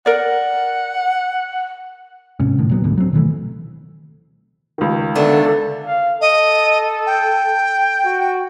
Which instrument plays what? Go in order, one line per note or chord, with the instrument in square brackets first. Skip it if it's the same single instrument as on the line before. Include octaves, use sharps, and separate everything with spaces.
[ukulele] A#4 D5 [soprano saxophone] F#5
[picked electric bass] G#2 C3 C#4
G1 A2 D#3
A#2 F#3 B3
D2 G#2 B2 D3
F#3 C4
B2 D#3 E3 A3
[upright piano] C#2 D#3
[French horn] D3 [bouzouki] A3 B3 D4 [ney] A4
[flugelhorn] F5
[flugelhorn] A4 [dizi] D#5
[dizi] G5
[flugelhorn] F#4